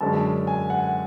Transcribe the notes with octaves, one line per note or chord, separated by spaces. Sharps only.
F#2 D3 G#3 C#4 A5
G#5
F#5